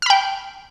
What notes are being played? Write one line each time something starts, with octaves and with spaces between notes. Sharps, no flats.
G5 B5 F6